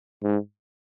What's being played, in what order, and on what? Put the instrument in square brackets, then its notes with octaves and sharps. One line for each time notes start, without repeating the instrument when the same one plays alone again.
[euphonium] G#2